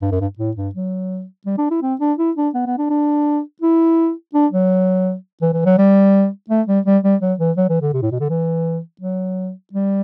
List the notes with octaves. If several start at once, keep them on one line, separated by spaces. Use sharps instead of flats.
G2
F#2
G2
A2
G2
F#3
G3
D4
E4
C4
D4
E4
D4
B3
B3
D4
D4
E4
D4
F#3
E3
E3
F#3
G3
A3
G3
G3
G3
F#3
E3
F#3
E3
D3
C3
A2
B2
D3
E3
F#3
G3